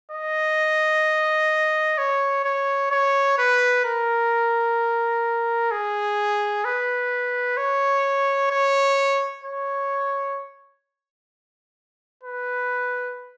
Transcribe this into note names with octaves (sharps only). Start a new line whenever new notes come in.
D#5
C#5
C#5
C#5
B4
A#4
G#4
B4
C#5
C#5
C#5
B4